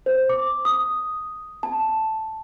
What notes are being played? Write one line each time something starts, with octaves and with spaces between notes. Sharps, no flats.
C5
D6
D#6
A5